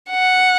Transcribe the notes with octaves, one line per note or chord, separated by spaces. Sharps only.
F#5